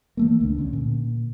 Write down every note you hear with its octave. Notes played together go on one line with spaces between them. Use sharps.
E3 A3 A#3
C#2 D3
D3 C#4
A#2